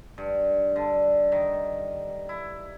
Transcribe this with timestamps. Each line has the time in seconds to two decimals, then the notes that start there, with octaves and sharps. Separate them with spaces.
0.18 G2
0.76 D3
1.32 D#3
2.29 E4